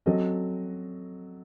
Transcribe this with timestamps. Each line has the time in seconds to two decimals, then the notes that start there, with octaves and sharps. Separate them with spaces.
0.06 F#3 C4 F#4 A4 D#5